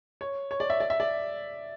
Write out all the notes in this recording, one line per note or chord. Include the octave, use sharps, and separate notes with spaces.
C#5
C#5
D5
E5
D5
E5
D5